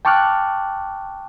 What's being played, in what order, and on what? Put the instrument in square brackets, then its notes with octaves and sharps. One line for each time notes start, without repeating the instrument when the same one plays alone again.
[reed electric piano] G5 A5 C#6 D6 F6 F#6